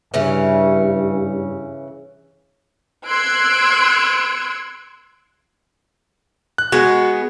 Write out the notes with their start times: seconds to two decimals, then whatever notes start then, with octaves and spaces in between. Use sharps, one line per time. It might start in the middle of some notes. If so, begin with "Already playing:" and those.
0.14 G2 C#3 E3 C#4
3.06 C6 E6 F#6 G#6 D7
6.58 F#6
6.72 G#3 B3 F#4